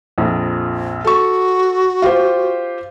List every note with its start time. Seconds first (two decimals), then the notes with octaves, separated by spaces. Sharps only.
0.18 A#1 F2
1.04 F#4 A4 C#6
2.02 F4 G4 C5